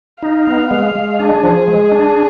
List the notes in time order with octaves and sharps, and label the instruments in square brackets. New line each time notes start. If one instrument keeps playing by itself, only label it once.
[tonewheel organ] D#4 [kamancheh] F5
[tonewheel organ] B3
G#3
G#3
[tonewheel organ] D4 [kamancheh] G#4
[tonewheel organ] F3
G#3
D4